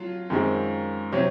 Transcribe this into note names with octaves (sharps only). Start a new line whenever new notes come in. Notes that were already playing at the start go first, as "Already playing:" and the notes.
Already playing: F#3 F4
F#2 D#3 G#3 C4
C3 F#3 C4 C#5